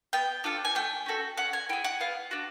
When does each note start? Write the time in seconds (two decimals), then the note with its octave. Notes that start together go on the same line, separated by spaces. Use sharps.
0.13 B3 G5
0.44 D4 F4 A4
0.65 G#5
0.75 A3 G5
1.06 C#4 F#4 A4
1.37 C#4 F#5
1.53 G#5
1.69 E4 G#4 G5
1.84 F#5
2.00 B3 F5
2.31 D4 F#4